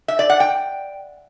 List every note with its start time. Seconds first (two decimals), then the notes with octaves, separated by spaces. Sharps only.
0.08 E5
0.19 D5
0.30 F#5
0.40 G5